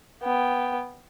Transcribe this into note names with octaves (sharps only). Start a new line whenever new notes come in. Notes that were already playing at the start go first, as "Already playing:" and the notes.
B3 G5